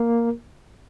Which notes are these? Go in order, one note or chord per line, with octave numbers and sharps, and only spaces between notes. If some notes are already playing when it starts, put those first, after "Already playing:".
Already playing: A#3 A#4